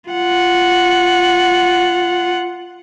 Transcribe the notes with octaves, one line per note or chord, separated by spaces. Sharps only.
F4 F#5